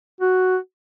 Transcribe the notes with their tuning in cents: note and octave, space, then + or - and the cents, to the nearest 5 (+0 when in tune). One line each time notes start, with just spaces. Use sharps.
F#4 +0